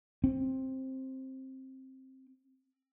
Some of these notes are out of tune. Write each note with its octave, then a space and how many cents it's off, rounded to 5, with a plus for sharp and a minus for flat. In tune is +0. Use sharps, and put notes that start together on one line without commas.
C4 +10